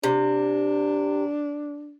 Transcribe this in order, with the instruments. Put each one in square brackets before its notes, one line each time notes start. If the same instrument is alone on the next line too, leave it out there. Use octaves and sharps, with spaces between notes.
[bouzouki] C3 [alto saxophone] D4